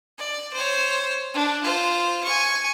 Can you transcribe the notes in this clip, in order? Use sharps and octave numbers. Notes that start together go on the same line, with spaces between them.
D5
C5 C#5
D4
F4 C5
G#5 C#6